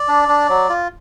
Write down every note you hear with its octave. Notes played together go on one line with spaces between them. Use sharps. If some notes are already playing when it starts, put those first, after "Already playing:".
Already playing: D5
D4
D4
F#3
F4